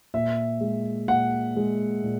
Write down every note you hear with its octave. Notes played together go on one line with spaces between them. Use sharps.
A#2 E5
G#3
A#2 F#5
G#3
A#2